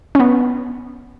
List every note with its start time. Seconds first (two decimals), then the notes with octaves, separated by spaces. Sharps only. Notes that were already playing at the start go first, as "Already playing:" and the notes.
0.15 C#4
0.20 B3